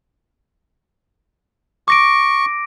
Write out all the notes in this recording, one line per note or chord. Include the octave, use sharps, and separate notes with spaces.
C#6 D6 A#6 D7